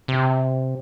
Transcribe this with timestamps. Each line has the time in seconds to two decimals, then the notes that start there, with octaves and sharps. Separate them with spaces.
0.08 C3